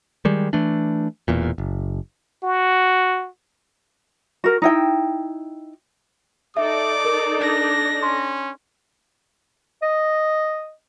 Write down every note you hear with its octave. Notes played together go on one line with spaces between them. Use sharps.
D#3 G3 G#3
E3 A3 D4
E1 E2 A#2
F#1
F#4
F#4 A#4
D#4 E4 G5
D#4 A4 D5 E5 D6
A#4
D4 A#6
C#4 C6
D#5